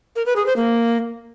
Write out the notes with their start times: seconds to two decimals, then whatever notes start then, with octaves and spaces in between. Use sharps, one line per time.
0.16 A#4
0.26 B4
0.36 G#4
0.46 C5
0.56 A#3